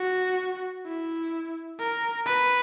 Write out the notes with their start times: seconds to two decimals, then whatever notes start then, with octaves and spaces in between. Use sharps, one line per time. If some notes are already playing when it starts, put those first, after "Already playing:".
Already playing: F#4
0.86 E4
1.80 A#4
2.26 B4